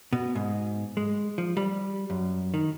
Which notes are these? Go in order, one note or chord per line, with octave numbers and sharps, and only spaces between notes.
B2
G#2
G#3
F3
G3
F#2
D#3